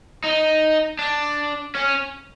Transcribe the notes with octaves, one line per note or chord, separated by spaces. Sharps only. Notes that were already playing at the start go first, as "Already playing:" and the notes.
D#4
D4
C#4